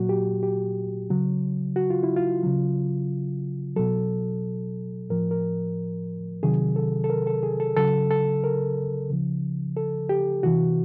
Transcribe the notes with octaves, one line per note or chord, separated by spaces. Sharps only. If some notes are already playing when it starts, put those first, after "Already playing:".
Already playing: A#2 F#3 F#4
G4
G4
C#3 F#3
F#4
F4
E4
F4
C#3 F#3
B2 F#3 A4
A2 F3 A#4
A#4
C3 D#3 F#3 G#4
A4
A4
A#4
A4
G#4
A4
C#3 F#3 A4
A4
A#4
C#3 F3
A4
G4
C3 E3 F#4